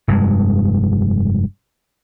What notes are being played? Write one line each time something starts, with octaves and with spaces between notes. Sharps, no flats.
F1 G2 G#3